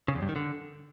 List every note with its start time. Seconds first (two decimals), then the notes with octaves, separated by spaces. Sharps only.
0.08 C#3
0.15 E2
0.22 G2
0.29 D#3
0.36 D3